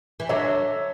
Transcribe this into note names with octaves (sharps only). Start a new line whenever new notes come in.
E3
D3 F#3 C#5 E5